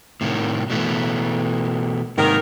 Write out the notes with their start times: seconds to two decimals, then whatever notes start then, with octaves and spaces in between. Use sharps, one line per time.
0.21 A2 C3 D#3
0.70 B2 E3 A3
2.18 G#2 C3 D#3 A#4